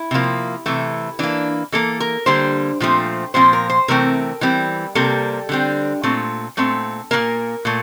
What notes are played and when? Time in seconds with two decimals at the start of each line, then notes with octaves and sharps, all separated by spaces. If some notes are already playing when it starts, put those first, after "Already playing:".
Already playing: E4
0.11 C3 F3 A#3
0.66 C3 E3 A3
1.19 E3 A#3 D4
1.72 E3 A#3 A4
2.00 A#4
2.26 D3 G3 A#3 C5
2.80 A#2 F3 A3 C4
3.34 A#2 F3 C4 C5
3.53 A#4
3.70 C5
3.88 C3 E3 A3 C4 A#4
4.41 E3 G3 C4
4.95 C3 G3 A#3 A4
5.49 D3 G3 C4
6.03 A#2 A3 C4
6.57 A#2 A3 C4
7.11 A#2 F3 A#3 A#4
7.65 A#2 A3